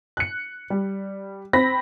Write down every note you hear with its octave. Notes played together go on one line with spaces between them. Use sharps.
F#6 C#7
G3
C4 B5 A#6 B6